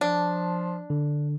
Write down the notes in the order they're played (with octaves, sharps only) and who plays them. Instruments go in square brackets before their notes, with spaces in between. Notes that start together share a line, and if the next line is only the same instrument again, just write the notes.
[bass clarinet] F3 [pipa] D4
[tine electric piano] D3